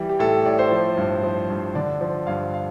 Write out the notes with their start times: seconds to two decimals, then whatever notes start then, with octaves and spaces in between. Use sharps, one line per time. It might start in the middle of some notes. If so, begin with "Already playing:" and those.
Already playing: E3 G3
0.09 G4
0.19 A2 A4
0.45 A2 D5
0.59 C5
0.71 F3
0.97 G2
1.23 F3
1.50 G2
1.75 D3 D5
2.01 F3
2.27 G2 F5
2.54 F5